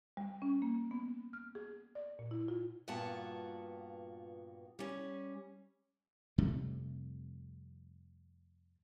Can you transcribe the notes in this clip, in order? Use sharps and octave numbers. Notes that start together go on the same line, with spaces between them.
G3
C#4
A#3
B3
F6
G#4
D5
A#2
E4
F4
G2 A#2 B3 F4 F#4 A5
G3 C#4
F2 C3 G3 A3